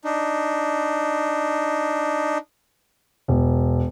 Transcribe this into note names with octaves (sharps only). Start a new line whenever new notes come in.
D4 D#4
E1